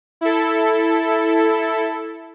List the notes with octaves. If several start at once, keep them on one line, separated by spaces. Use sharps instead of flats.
E4 A4